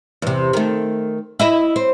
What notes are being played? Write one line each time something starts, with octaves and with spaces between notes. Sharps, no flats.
E2 C3
D#3 A3
E4 D#5 E5
C4